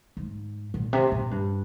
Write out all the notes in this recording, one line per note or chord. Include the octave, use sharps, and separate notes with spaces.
G#2
A#2
C3
A#2
G2